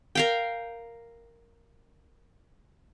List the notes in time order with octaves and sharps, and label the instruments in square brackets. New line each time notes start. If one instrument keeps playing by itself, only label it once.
[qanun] A#4 F5 G5